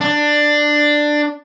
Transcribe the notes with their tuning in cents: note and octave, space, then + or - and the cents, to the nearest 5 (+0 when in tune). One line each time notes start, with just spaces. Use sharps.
D4 +10